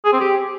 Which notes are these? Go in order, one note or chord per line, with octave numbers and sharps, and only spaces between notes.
G#4
C4
G4